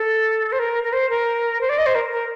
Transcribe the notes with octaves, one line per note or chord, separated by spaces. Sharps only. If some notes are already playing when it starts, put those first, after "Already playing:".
Already playing: A4
C5
A#4
A#4
C5
A#4
C5
D5
D#5
C5
A#4
A#4